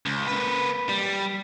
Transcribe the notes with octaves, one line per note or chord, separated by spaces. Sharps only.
C#2
A#3 B4
G3